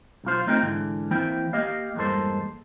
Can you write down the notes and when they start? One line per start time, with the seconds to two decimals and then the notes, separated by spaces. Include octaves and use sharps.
0.24 B1 F#2 F4 C5
0.47 A3 C4 D#4 F4 F5 G5
0.62 G#2 D3 E3
1.11 E3 A#3 C4 E4 G5
1.53 A#3 G4 D#5 F5
1.95 E2 G2 G#3 A#3 A4 C5